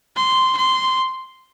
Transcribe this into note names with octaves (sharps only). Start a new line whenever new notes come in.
C6
C6